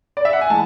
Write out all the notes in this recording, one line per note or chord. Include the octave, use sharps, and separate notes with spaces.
D5
E5
F#5
G#5
E3 G#3 A5